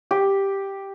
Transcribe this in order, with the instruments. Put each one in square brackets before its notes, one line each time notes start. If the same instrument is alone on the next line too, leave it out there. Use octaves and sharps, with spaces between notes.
[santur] G4